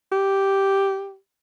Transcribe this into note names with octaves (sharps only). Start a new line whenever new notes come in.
G4